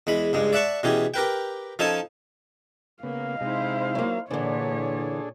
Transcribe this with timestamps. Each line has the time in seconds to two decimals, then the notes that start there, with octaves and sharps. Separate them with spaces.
0.07 E2 G#3 B5
0.33 C#2 G2 G#3
0.53 D5 E5 F#5 A5 C#6
0.83 B2 E3 C#4 G4 G#4
1.14 G4 A#4 B4 G5
1.79 F3 C#4 D#4 A4 G#5 A5
3.03 C#3 A#3 B3 F5
3.41 C3 G#3 D#4 E4 C5
3.95 F#3 A#3
4.31 A#2 D3 E3 D4 G#4 A4 C#5